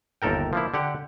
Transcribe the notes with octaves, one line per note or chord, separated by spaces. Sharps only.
G1 D#2 A4 A#4 G5
F3 A#3 E4
D3 G4 F#5